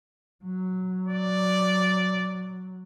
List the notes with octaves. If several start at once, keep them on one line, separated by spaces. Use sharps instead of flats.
F#3
D5